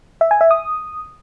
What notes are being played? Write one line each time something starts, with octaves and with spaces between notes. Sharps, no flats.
E5
G#5
E5
D#6